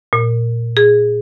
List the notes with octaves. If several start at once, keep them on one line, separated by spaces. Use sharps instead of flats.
A#2
G#4